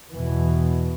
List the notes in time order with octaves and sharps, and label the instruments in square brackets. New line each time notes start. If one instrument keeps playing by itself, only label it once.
[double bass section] E2 B2 E3